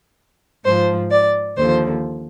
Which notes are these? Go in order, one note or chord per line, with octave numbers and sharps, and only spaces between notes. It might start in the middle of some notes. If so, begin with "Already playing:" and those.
G#2 F3 C5
D5
D#2 D3 F3 C5